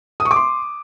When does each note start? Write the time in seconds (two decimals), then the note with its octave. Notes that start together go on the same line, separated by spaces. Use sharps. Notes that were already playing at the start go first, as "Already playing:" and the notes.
0.20 D#6
0.25 C#6
0.31 D6
0.36 C6